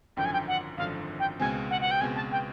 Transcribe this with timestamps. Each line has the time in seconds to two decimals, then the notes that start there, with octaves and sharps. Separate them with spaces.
0.16 G#1 F#2 D3 F3 G5
0.25 G#5
0.33 G5
0.48 F#5
0.78 G#1 F#2 D3 F3 F5
1.19 G5
1.40 C#2 B2 G#3 C4 G#5
1.70 F#5
1.81 F#5
1.91 G5
2.01 C#2 B2 G#3 C4 G#5
2.16 A5
2.32 G5